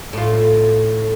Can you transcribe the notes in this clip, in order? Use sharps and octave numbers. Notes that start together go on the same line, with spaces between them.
A2 F4